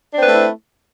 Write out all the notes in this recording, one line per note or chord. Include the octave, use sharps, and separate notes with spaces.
A3 C4 D4 E4 B4